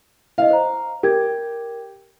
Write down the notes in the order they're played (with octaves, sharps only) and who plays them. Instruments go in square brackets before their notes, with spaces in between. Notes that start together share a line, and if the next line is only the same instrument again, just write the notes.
[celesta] E4 D#5 [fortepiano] F5
[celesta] C5 A#5
[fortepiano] G4 [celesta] A#4 G5 G#6